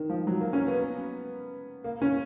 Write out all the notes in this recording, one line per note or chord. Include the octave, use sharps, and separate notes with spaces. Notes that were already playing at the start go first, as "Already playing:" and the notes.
Already playing: D#3
F3
F#3
A#3
C#4
B3
A#3
C#4